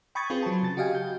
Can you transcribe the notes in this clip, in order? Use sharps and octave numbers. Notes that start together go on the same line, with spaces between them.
G5 B5 C#6 D#6 G#6 A6
C4 F4 G#4 B4 C5
F#3 A5
C#3 A6
F#4 G4 D#5 F5 G5 G#5
G6